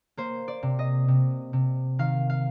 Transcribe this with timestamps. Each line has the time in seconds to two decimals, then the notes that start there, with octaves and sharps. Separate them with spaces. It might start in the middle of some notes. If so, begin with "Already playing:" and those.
0.17 A#3 C5
0.48 D5
0.63 C3
0.79 D#5
1.08 C3
1.53 C3
1.99 D#3 F5
2.30 F5